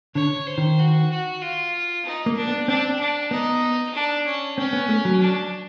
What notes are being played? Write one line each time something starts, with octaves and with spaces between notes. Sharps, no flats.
D3 C#5
C5
D#3
F#4
F#4
F4
D#4
A#3
D4
B3
C4 D4
D4
B3 D#4
D4
C#4
C4 C#4
B3
A3
F#3
D4